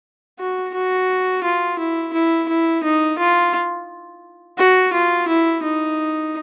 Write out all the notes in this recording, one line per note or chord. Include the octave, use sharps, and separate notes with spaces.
F#4
F#4
F4
E4
E4
E4
D#4
F4
F#4
F4
E4
D#4